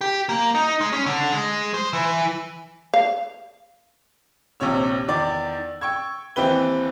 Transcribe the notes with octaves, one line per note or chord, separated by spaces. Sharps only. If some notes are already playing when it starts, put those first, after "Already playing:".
G4
A#3
D#4
G#3
C#4
D3
G#3
C5
E3
F5
A#1 D#2 C3 C#5 E6
E2 D#3 D5 D6 A6
G5 C#6 E6 G#6
D#2 E3 C4 G4 B4 G7